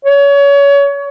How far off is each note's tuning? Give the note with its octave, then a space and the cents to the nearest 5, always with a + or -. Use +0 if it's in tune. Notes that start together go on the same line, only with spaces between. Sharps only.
C#5 +30